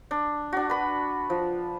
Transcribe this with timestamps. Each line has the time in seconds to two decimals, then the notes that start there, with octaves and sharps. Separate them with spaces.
0.11 D4
0.52 D4 F#4
0.70 B4 B5
1.30 F3